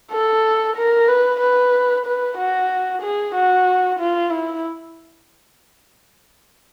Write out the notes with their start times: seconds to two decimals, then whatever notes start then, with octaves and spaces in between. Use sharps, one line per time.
0.12 A4
0.77 A#4
1.08 B4
1.40 B4
2.06 B4
2.37 F#4
3.02 G#4
3.35 F#4
3.99 F4
4.31 E4